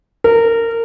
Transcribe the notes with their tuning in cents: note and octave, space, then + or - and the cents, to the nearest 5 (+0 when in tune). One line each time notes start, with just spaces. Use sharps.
A#4 -20